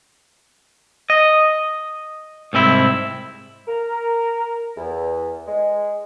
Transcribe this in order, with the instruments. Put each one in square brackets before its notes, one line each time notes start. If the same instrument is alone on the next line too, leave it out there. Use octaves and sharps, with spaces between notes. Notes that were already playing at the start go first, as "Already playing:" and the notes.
[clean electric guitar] D#5
C2 G#2 C4 E4
[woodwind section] A#4
E2
G#3